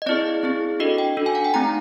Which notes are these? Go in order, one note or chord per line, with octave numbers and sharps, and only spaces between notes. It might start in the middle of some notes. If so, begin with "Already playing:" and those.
D#5
C4 E4 G#4 D5
C4 E4 G#4
D4 F#4 A4 D#5
G5
D4 F#4 A4
G#5
F#5
G5
A3 C4 D#4 G4 A#5